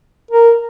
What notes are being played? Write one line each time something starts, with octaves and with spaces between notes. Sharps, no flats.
A#4